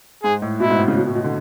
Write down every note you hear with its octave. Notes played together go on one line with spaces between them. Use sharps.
G#2 G#4
A2
B2 E4
G#2
A2
C#3
B2
A2
B2
D3